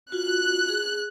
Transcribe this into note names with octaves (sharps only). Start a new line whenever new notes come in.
F4 F#4 F#6
G#4